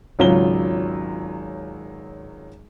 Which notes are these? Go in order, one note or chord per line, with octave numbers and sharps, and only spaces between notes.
G#1 C#2 F#3 C#4 F4 G7